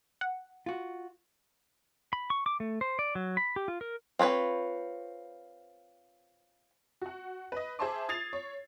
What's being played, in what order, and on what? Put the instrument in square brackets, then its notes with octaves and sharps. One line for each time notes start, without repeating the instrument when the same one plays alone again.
[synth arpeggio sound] F#5
[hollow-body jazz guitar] F4 F#4
[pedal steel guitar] B5
C#6
D6
A3
C5
D5
F#3
B5
G4
F4
A#4
[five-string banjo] C4 F4 B4 C#5
[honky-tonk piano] F#4 F#5
B4 D#5
G#4 C5 E5 A5 C6 D6
D#6 G#6 A6 C7 F7
C#5